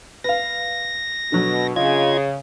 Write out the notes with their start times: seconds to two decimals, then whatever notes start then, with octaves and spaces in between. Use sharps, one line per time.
0.24 B4 F5 A#6
1.32 B2 D3 F#3
1.76 C#3 F4 D#5 G#6